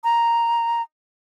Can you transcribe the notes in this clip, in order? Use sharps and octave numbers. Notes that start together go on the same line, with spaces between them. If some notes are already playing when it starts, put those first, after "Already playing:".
A#5